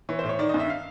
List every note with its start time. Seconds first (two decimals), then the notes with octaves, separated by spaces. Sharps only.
0.09 E3 C#5
0.19 C5
0.24 A2
0.29 C#5
0.39 D#3 D5
0.49 D#5
0.54 G2
0.59 E5
0.70 F5